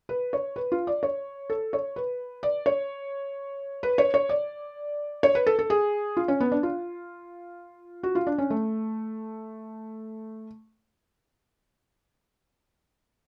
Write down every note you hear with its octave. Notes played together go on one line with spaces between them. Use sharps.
B4
C#5
B4
F4
D5
C#5
A4
C#5
B4
D5
C#5
B4
C#5
C#5
D5
C#5
B4
A4
A4
G#4
F4
C#4
B3
D4
F4
F#4
F4
D4
C#4
A3